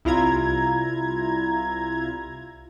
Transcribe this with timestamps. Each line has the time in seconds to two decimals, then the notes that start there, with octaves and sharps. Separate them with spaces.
0.05 C2 E4 F4 A#5 G#6